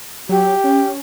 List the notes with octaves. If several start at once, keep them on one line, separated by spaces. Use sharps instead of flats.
F#3 G4
C#4